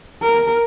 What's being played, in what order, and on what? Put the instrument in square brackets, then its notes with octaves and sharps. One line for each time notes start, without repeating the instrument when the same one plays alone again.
[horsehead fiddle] A#4